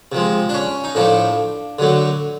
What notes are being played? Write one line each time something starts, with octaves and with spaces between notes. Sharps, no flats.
C3 F3 G#3
D4
C#4
D#4
A2 F3 A3 D4
D3 F#3 A3